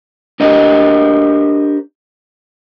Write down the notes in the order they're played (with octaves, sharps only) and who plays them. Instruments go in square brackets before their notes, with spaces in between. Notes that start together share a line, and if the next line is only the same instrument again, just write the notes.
[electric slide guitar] D4 G4 A#4 C5 D#5